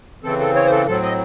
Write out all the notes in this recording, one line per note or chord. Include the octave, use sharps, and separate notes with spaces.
C#3 E3 C4 A4
A4
C#5
C5
A4
A2 F#3 C4 A4
D#5